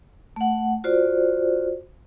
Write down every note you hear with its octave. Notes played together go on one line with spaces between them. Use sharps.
A3 F#5
F4 F#4 C5 D5